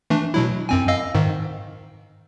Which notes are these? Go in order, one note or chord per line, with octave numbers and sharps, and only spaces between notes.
E3 A3 D4
B2 F#3 E4
F#2 C4 G#5
D#5 F5 E6
G#2 D#3